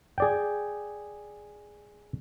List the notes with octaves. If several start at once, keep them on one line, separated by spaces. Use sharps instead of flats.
G#4 D5 G5